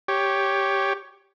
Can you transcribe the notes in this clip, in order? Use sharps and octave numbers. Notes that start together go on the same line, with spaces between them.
G4 C#5